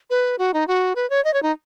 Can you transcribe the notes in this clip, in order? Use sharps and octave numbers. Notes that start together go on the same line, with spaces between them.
B4
F#4
D#4
F#4
B4
C#5
D#5
C#5
D#4